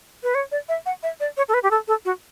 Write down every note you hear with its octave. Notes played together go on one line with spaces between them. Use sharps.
B4
C#5
D5
E5
F#5
E5
D5
C#5
A4
B4
G4
A4
A4
F#4